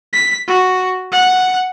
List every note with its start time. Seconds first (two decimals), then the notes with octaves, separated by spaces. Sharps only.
0.13 B6
0.47 F#4
1.12 F#5